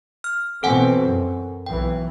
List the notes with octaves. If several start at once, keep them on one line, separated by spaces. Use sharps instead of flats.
F6
B2 E3 C4 A4 F#5 G#5
F#2
B1 E3 G5